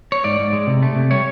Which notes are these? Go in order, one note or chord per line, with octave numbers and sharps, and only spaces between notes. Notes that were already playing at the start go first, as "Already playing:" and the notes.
C#5
G#2 D5
G#2
G#3
C3
A3
C3
G3 C#5